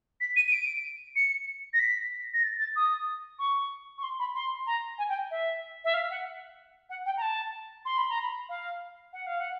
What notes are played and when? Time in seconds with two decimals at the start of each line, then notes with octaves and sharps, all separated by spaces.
0.20 B6
0.36 D#7
0.47 D#7
0.52 D7
1.15 C#7
1.73 A#6
1.79 B6
2.33 A#6
2.43 A6
2.59 A6
2.75 D#6
3.39 C#6
3.98 C#6
4.03 C6
4.19 B5
4.35 C6
4.66 A#5
4.98 G#5
5.09 G5
5.30 E5
5.84 E5
5.94 F5
6.10 F#5
6.89 F#5
7.05 G5
7.17 A#5
7.21 A5
7.85 C6
7.97 B5
8.09 A#5
8.21 B5
8.49 F5
9.13 F#5
9.26 F5
9.40 F#5